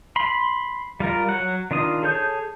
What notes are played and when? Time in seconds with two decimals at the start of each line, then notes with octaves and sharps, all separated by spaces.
0.16 B5 C6
1.00 G3 F4 A#4
1.29 F#3 F#5
1.71 D#3 D4 F4 D#6
2.03 G#4 A4 C#5 G6